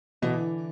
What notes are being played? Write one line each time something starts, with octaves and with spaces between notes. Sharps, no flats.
B2 D3 E3